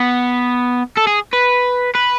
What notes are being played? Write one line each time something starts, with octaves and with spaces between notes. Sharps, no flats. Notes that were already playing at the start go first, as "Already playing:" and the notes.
Already playing: B3
A4
G#4
B4
B4